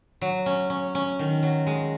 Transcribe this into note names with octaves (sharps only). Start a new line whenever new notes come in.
F#3
C#4
C#4
C#4
D#3
F#3
G#3